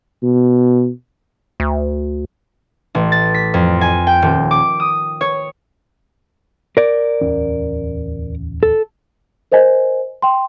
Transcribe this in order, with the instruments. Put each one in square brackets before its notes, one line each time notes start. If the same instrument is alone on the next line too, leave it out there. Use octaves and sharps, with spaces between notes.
[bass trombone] B2
[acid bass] D2
[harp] A1
A6
B6
F2
G#5
G5
D#1
D6
D#6
C#5
[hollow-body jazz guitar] A#4 D5
[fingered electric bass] D1 E2 C#4
[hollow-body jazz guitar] A4
[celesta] A#4 C5 D#5 G#5
G5 C6